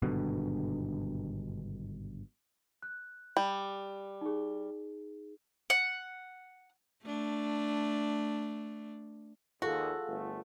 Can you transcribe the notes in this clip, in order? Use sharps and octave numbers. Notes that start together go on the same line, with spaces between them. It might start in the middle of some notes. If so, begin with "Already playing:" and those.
G#1 G2 B2 D3
F#6
G3
D#4 G#4
F#5
A3 D4
D#2 F4 F#4 G#4 A4
G1 A3